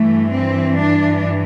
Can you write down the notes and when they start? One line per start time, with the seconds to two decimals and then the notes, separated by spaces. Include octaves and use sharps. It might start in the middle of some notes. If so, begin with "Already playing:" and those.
Already playing: G2 E3 A3
0.33 C4
0.78 D4